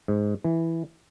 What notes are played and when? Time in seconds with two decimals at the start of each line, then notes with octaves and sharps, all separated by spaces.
0.08 G#2
0.45 E3